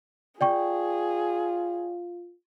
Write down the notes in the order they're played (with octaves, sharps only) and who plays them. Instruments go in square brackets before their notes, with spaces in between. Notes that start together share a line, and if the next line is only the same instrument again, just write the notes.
[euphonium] F4 [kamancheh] G#4 [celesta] D5 G5 C#6